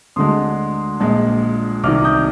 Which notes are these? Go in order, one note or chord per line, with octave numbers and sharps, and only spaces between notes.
D2 D3 G#3 C6 D#6
A#1 A#2 G#3
C2 C3 D#3 D6 F6
D#6 G6